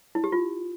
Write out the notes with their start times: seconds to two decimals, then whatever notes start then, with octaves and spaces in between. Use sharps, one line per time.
0.15 E4
0.24 G4
0.32 F4